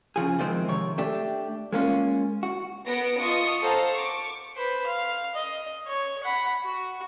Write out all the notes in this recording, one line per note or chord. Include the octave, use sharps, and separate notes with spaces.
C#3 F3 G#4
F2 C3 D#3 F3 G#3 C4
F2 C3 D#3 C#5
A3 D4 G4
G#3 A#3 C#4 F4
F#4
B3 B4 F#5 A#6 D7
F4 D#5 A5 C#6 D#6 C#7
A4 C5 F5 F#5 A5 A#5
C#6 D6
B4 C5
F5
D#5
C#5
F#5 B5
F#4